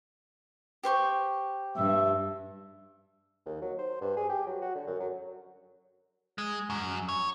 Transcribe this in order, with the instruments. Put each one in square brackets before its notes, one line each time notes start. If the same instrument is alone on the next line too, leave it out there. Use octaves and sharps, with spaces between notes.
[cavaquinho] G4 C5 C#6
[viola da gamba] G2 [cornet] E5
[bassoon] D#2
F#3
C5
G2
G#4
G4
F#3
F#4
D3
F#2
F#3
[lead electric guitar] G#3
F#2
C#5